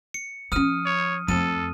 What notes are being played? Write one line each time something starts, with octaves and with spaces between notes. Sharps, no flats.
C#7
F3 C#4 D#6 F6 D#7
C#5
F2 A3 A4 D#7